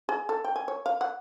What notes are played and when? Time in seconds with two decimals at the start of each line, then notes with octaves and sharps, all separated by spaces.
0.09 G#4
0.29 A4
0.45 G5
0.56 G#5
0.68 C#5
0.86 F5
1.01 F#5